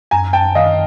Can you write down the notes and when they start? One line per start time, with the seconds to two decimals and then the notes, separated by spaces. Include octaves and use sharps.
0.11 F#2 G#5 A#5
0.33 F#2 G5 A5
0.55 D#3 D#5 F5